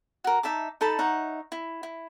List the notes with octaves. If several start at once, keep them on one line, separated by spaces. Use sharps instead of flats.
F#4 A#4
D#4 E5 A5 D6
D#4 A4 A5 B5
D#4 C#5 E5 F#5
E4
E4